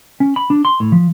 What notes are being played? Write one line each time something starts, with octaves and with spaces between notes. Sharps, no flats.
C#4
B5
D4
C6
A2
F3